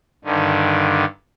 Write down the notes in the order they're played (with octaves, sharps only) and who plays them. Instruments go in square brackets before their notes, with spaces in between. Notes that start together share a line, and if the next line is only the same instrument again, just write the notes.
[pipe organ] G2 D3 D#3